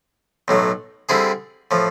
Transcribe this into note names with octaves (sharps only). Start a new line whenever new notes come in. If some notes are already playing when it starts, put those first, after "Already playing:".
B1 A2 F#3
D3 G3 C4 E4 G#4
A2 F3